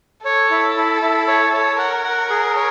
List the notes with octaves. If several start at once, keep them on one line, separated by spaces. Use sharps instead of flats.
A4 C#5
E4
E4
E4
C#5
C#5
A#4 F#5
F#5
G#4
C#5